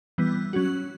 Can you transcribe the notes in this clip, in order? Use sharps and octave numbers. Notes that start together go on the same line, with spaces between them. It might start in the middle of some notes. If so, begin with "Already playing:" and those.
E3 G3 B3
F#3 C#4 F#4